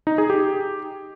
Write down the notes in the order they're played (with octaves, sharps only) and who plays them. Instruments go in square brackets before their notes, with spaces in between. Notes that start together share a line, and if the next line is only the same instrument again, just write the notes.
[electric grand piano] D#4
G#4
G4